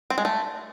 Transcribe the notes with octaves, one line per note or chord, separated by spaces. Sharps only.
C4
G#3
A3